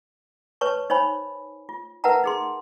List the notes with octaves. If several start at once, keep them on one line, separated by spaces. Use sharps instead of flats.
B4 C#5 A5 C#6
D#4 C5 C#5 G#5 B5
F4
A#4 B4 E5 F#5 A5 A#5
D#4 G#4 C6